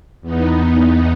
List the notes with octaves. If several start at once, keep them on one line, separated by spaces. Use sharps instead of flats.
E2 B3 D#4